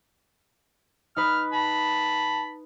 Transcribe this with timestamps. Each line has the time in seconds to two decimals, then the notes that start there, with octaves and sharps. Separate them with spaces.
1.17 D#4 B4 F6
1.53 A5 B5